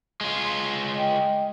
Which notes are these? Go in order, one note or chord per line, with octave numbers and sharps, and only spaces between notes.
G#3 F4
D#5 G5